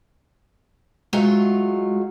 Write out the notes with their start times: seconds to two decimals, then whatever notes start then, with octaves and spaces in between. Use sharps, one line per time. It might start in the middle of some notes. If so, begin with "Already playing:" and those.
1.13 F#3 G#3 A3 F4